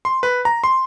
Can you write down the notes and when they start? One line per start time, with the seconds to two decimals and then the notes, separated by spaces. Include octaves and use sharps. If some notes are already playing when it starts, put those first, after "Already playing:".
0.05 C6
0.23 B4
0.45 A#5
0.64 C6